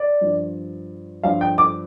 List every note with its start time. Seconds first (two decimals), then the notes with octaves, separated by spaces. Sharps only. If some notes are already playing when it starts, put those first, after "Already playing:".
Already playing: D5
0.21 G2 F3
1.23 G2 F3 F5
1.41 G5
1.58 D6